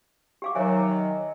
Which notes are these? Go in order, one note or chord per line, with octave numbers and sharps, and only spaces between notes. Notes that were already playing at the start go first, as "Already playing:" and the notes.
G4 F5 D6
D#3 F#3 C#5 E5 G#5